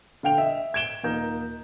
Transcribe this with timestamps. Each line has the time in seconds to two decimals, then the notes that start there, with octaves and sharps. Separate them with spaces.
0.23 D3 F5 G5 F7
0.38 D#5 E5
0.74 G#6 D7 E7 G7
1.04 D#1 A#3 D#4 A#4 G6